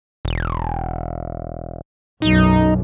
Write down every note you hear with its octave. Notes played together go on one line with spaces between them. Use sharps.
E1
B1 F#2 D#4